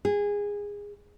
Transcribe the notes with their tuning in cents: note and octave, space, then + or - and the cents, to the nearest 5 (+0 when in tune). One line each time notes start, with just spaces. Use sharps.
G#4 -20